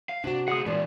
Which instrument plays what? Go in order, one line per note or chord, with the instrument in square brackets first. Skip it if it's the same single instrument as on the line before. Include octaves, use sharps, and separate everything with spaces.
[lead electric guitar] F5
[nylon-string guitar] C3 F#4 [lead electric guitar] D4
[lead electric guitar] D2 G#4 [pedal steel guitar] F#5 D#6
[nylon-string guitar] A#2 D4 [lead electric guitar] E3 G#3 [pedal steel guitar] D5